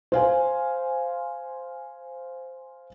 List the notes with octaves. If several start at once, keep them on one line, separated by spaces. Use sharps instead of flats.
C5 F5 G#5